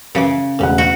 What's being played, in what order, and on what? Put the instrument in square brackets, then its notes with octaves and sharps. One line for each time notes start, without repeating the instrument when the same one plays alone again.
[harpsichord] F#2 E3 D6 [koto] C#3
[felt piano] E1 F#5 [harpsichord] A2 C#3
[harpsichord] E4 [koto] F#4